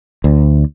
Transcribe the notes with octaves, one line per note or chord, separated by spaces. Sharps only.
D2